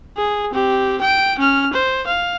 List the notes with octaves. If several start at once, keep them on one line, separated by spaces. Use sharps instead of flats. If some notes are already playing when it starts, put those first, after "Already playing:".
G#4
C4 G4
G5 D7
C#4 F6
C5
F5